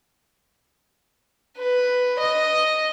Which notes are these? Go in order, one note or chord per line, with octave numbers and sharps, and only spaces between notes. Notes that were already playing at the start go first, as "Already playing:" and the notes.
B4
D#5